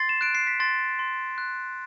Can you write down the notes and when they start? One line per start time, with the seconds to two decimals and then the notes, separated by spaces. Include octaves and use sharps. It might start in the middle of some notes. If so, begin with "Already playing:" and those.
Already playing: C6 A6 C7
0.09 E7
0.21 F#6 D7
0.35 C7
0.47 B6
0.60 C6 A6
0.99 C6
1.38 F#6